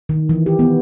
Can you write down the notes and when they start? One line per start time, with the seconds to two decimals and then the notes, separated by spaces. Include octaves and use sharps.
0.09 D#3
0.29 E3
0.46 G4
0.59 B3